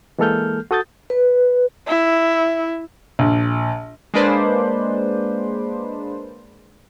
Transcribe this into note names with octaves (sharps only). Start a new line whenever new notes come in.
E3 G#3 A#3 A4 F6 G6
F#4 A4 D#6 G6 A6
B4
E4
A#1
G#3 A#3 D4 B4 C5 D5